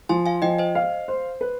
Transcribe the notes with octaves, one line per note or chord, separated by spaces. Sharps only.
F3 G#5 C6
F5 G#5
F3 D#5 G5
C5 D#5
F5
C5
B4